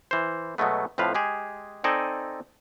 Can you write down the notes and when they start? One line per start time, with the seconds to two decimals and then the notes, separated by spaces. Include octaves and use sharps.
0.11 E3 C5
0.58 B2 F#3 G#3 A3 B3
0.98 F2 A2 F3 B4 F5
1.15 G#3 G4 G#4
1.84 C4 D#4 A4 D5 D#5 G#5